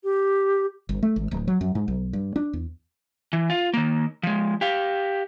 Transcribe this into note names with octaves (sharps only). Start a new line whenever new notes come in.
G4
G1
A3
G#1
D1
F#3
F#2
G#2
B1
G2
D4
E2
E3
F4
D#3 A#3
F3 G#3
G4 F5